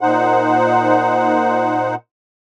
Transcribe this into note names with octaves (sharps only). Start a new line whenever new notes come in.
A#2 D#4 C5 F#5